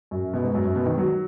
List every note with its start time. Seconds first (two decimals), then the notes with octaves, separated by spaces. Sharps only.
0.11 F#2
0.33 B2
0.43 G#2
0.54 F#2
0.65 F#2
0.76 B2
0.86 D#3
0.98 F#3